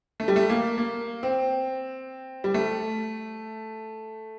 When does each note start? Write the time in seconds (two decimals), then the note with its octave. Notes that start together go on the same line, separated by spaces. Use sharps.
0.20 A3
0.28 G3
0.36 A3
0.50 A#3
0.78 A#3
1.23 C4
2.44 G3
2.54 A3